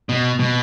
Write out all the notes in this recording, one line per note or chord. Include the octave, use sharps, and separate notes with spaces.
B2
B2